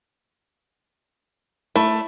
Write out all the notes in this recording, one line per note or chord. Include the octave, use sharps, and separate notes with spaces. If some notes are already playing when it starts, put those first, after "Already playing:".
A3 E4